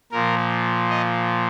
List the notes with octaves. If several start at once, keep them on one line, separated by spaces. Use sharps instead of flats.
A#2 F3 A#4
D#5